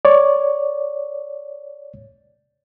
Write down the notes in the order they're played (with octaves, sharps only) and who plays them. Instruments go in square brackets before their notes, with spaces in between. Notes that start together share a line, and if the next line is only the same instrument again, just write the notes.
[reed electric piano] C#5 D5